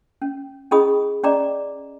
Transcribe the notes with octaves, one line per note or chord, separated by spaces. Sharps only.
C#4
C#4 E4 G#4 D#5 B5 D#6
C#4 D5 D#5 A#5 D6